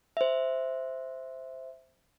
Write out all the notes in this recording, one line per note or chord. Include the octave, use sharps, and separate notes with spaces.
C5 E5